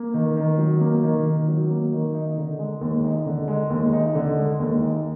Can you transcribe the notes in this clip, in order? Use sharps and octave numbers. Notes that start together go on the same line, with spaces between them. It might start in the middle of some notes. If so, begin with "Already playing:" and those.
Already playing: A#3
D#3
D#3
F#3
A#3
D#3
D#3
F#3
A#3
D#3
D#4
D3
G#3
D#2
D#4
D3
G#3
D#2
D#4
D3
G#3
D#2
D#4